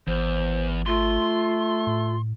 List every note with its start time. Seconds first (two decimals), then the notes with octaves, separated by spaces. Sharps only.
0.07 G#1 E2 C5
0.86 A3 F4 C6
1.87 A2